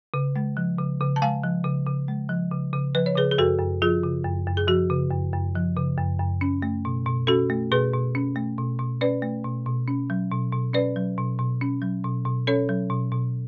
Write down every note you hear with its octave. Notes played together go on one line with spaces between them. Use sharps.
C#3
G#3
F3
C#3
C#3
A5
G#3 F5 G#5
F3
C#3
C#3
G#3
F3
C#3
C#3
F3 B4
C#5
C#3 G#4 B4
G#4
F#2 F#4 A4
F#2
F3 F4 G#4
C#3
F#2
F#2
G#4
F3 F#4
C#3
F#2
F#2
F3
C#3
F#2
F#2
C#4
A3
B2
B2
C#4 F#4 A4
A3
B2 G#4 B4
B2
C#4
A3
B2
B2
C#4 B4 D5
A3
B2
B2
C#4
F#3
B2
B2
C#4 B4 D5
F#3
B2
B2
C#4
F#3
B2
B2
C#4 A4 C#5
F#3
B2
B2